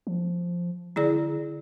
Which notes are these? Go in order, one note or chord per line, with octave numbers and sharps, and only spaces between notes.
F3
D3 E4 G#4 D5